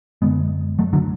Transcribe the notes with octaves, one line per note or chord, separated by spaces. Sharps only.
F#2 D3 G#3 B3
F#3 A3
D3 F#3